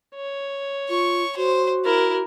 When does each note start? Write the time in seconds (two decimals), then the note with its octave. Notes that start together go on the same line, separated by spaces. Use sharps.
0.15 C#5
0.89 F4 C#6
1.37 F#4 C5
1.85 E4 A#4